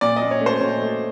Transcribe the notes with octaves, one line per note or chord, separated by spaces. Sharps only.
A#2 D5
A#2 D#5
C#5
A3
C5
A#2 C#5
A3